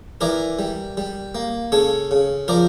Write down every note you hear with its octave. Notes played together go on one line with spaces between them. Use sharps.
E3 A#4 D5
G3
G3
A#3
C#3 A4 C#5
C#3
F3 A#4 D5